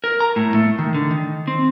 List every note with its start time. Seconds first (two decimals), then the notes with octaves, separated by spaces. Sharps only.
0.04 A#4
0.20 A#5
0.36 A2
0.55 A3
0.79 D#3
0.95 D3
1.11 D#3
1.48 C4